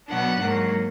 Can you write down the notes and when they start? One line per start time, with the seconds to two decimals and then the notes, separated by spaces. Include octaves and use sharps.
0.09 B2 F#3 B3 D4 F#5
0.38 G#2 F#3 A#3